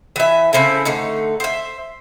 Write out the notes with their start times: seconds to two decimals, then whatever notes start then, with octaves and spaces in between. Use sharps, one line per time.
0.16 E3 E5
0.53 C#3 C4 E4 A4
0.85 D3 A3 D#4
1.40 C5 E5